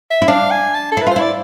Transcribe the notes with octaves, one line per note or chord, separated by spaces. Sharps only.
E5
E4
D4 F5
G#5
A5
A4
E4
B4
F4 C5
E4 D5